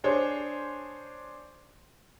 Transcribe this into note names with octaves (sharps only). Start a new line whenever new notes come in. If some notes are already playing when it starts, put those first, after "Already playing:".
D4 G#4 C5 C#5